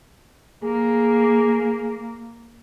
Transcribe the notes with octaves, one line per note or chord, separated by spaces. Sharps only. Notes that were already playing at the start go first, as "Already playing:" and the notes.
A#3 G#4